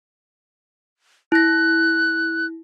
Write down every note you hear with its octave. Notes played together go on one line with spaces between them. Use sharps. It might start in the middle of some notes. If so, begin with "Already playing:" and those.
E4 F#6 A#6